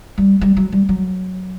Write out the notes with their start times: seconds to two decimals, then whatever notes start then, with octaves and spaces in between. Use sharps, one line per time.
0.18 G3
0.41 G3
0.57 F#3
0.72 G3
0.89 F#3